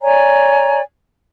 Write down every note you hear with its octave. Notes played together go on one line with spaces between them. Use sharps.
C#5 D5 G#5 A#5